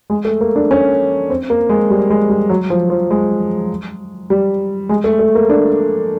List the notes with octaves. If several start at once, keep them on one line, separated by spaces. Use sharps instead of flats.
G#3
A3
A#3
D4
C#4
C4
A#3
G#3
G3
G#3
G3
F#3
F3
F3
G#3
G3
G#3
A3
A3
A#3
D4